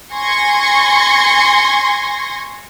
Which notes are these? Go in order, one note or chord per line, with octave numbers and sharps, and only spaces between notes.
G#5 C6 C#6 G#6 A#6